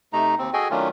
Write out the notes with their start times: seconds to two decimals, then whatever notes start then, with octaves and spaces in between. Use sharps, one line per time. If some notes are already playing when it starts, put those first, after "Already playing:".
0.13 C3 A3 D#4 A#5
0.38 D#2 C4
0.53 F#4 G#4 A4 D#5 G5 G#5
0.71 D#3 F#3 A3 C#4 D4 F4